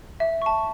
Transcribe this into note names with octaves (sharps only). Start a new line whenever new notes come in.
E5
A5 C#6